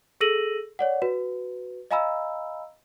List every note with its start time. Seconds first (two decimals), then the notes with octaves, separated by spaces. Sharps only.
0.21 G#4 A4 E6 A#6 D#7 F#7
0.79 C#5 D5 F#5
1.02 F#4 B4
1.91 D#5 F5 G#5 A#5 B5 E6